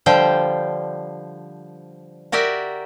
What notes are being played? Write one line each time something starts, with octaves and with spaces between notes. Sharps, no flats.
D3 F3 G3 C5 G5
F#4 G4 A#4 D5 E5 F#5